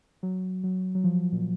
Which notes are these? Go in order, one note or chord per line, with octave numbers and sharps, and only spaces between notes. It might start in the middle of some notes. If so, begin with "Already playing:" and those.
F#3
F#3
F#3
F3
A#2